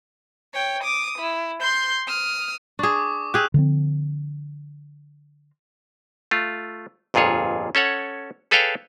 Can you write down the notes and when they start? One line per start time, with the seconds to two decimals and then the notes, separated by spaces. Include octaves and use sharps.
0.54 C#5 G5
0.83 D6 D#6
1.18 E4
1.61 C6 G6
2.08 D#6 F6
2.79 D4 G#4 C#6 D6
3.34 G4 G#4 E6 F#6
3.54 D3 F3 A3 C4
6.31 A3 F4
7.14 G1 F2 A#2 F4 G#4 C#5
7.75 C#4 A4 C#5 F#5
8.51 G#4 A4 B4 C#5 F5 G5